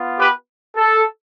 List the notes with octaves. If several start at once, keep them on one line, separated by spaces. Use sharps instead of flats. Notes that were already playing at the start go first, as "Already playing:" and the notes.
Already playing: B3 F4
G4 B4
A4